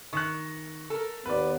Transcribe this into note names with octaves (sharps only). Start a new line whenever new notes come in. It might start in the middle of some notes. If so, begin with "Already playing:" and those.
D#3 C#6 F#6
A4 A#4
D#2 B3 B4 D5